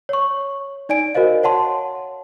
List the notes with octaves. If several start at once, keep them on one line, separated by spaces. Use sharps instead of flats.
C#5 C#6
D#4 D5 G#5 D7
F#4 A#4 C5 D#5 F5
C#5 F#5 A5 C6